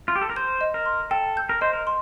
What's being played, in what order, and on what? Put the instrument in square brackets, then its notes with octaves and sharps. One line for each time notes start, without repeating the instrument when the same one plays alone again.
[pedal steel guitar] F4
G4
A4
A#4
[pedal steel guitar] C5 [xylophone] G6
[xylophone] D#5
[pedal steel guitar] A#4
[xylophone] C6
[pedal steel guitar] A4 [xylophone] G5
[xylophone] G6
[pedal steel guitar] A#4
[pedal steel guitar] C5 [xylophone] D#5
[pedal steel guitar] A#4
[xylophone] C6